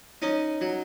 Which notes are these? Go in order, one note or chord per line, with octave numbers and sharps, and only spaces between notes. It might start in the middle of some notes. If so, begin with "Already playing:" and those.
C#4 D#4
F#3